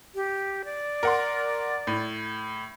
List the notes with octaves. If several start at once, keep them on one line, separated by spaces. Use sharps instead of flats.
G4
D5
A#4 F#5 C6
A2